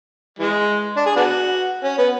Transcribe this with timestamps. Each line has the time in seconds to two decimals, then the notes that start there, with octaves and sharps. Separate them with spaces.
0.39 E3 G#3
0.97 D4
1.06 G#4
1.16 B3 D4 F#4
1.84 C#4
1.98 B3